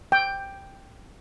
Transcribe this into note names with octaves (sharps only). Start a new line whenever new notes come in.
G5